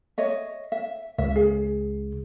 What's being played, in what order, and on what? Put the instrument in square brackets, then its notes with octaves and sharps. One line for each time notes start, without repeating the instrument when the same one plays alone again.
[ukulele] C#5 D#5 E5
E5
[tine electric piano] C#2 [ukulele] E5
[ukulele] G#4